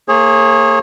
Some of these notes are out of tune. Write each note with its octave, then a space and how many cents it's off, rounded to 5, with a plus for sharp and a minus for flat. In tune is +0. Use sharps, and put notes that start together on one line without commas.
A#3 -30 G#4 +0 C#5 -35